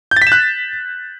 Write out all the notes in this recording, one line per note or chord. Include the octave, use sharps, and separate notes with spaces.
G6
A6
B6
E7
F#6